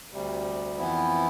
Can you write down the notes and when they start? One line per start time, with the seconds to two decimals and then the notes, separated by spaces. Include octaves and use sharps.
0.13 D2 C3 G3
0.78 F2 E3 B3 E4